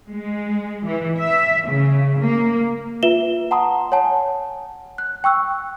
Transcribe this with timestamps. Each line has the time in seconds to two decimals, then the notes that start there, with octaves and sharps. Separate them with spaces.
0.10 G#3
0.86 E3
1.18 E5
1.69 C#3
2.20 A#3
3.03 F4 B4 E5 E7 G7
3.51 F#5 A5 A#5 C6 D#6
3.92 C#5 F#5 G#5 A5
4.98 F#6
5.24 G5 C#6 E6 F#6